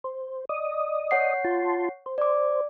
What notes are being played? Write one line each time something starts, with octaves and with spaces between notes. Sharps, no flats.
C5
D5 D#5 D#6
C#5 F#5 C7
F4 A5 C6
C5
D5 D6